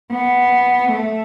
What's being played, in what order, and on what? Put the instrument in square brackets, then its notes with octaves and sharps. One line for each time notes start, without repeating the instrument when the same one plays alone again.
[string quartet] B3
A3